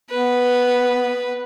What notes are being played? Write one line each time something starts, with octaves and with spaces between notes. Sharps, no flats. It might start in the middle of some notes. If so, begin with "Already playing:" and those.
B3 B4